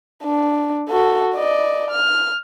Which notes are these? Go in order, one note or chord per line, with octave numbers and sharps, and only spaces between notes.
D4
F#4 A4
D5 D#5
F6